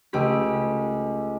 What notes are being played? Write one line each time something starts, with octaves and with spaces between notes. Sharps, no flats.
C#2 A3 G4 B6